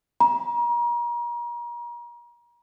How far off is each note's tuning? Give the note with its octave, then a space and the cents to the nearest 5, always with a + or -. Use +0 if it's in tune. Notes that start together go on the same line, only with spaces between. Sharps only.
A#5 +35